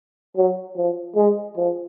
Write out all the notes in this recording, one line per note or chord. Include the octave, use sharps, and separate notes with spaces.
F#3
F3
G#3
F3